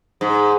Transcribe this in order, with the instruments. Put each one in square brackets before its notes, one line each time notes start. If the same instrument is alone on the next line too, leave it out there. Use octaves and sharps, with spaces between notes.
[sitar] G#2